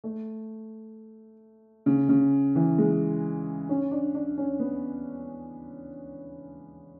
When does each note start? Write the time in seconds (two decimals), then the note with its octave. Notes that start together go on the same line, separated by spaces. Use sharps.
0.04 A3
1.86 C#3
2.09 C#3
2.55 E3
2.78 G#3
3.69 C#4
3.91 D4
4.14 D4
4.38 C#4
4.60 B3